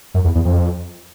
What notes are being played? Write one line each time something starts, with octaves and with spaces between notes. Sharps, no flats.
F#2
E2
E2
F2